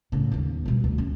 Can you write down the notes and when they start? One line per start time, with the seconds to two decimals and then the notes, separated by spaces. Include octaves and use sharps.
0.12 A2 C#3
0.32 D#2 B3
0.65 B2 G3
0.84 D2 D#3
0.98 C#4